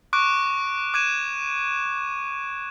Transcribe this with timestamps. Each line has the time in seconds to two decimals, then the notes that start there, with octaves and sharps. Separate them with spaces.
0.13 C#6 D6 F#6 D7
0.94 D6 F#6 G#6 D#7 E7